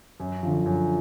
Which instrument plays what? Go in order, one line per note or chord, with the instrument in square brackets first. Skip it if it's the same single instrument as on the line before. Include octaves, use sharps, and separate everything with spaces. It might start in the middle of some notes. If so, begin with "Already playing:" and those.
[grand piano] F#2
D3 F3
F#2